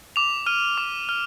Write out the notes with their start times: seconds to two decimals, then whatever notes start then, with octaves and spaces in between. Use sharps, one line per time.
0.16 D6 F7
0.46 F6 D#7
0.78 D6
1.09 F6